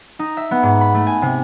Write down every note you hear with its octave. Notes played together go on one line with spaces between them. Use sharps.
D#4
E5
B3
G#2
B5
A3
G#5
C3